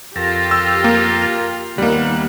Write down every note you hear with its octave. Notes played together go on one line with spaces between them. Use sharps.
F2 F4 G4 A4 A#4
E6
A#3
D#2 G3 A#3 B3 F#5